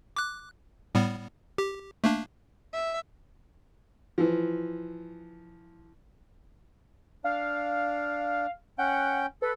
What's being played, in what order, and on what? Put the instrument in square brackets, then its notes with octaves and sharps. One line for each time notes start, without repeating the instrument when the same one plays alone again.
[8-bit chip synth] D6 F#6
A2 G3 B3
G4
A3 A#3 D4
[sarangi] E5
[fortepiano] E3 F3
[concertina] D4 [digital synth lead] F5
[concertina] C#4 G5 [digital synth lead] F#5
[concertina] A4 [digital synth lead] B4